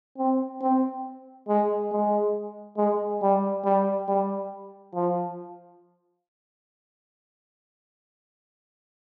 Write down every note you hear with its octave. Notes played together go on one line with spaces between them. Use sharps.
C4
C4
G#3
G#3
G#3
G3
G3
G3
F3